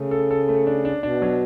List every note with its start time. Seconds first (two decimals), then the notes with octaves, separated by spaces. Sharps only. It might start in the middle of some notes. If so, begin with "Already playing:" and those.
Already playing: C#3 A3
0.11 A4
0.31 A4
0.49 A3
0.67 D4
0.85 D4
1.03 B2 D4
1.22 F#3